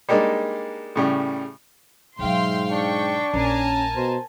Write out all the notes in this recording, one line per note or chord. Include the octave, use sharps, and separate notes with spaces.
G3 G#3 A#3 D4 D#4
A2 C#3 G3
G#2 B2 F#3 E5 F5 G5 C6
D4 G5 C#6
A#1 C#4 A#4 G#5 A5
B2 C5